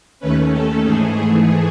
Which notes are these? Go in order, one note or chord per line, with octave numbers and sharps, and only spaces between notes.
D#2 D#3 A3 C#4 B4
A4
G#2 E3 A3 G#4